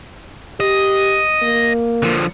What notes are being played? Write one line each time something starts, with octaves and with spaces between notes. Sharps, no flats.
G4 D#5
A#3
D3 F3